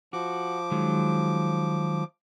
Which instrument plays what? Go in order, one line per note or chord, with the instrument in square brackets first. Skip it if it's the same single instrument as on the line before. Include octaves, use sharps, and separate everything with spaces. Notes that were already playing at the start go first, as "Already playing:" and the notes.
[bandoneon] F3 D6 [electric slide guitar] F#4
[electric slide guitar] D#3 F#3 G#3